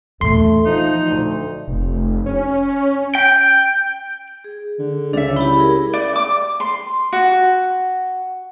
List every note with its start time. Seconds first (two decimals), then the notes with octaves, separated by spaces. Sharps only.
0.21 A#1 E2 A3 C6
0.65 F3 D#4
1.04 D2
1.68 F1
2.26 C#4
3.15 G5
4.44 G#4
4.79 D3
5.13 C#2 D4 C#5 D5 E5
5.36 E4 G4 B5
5.59 E4 G#4 A#4
5.94 D5
6.16 D6
6.60 C6
7.13 F#4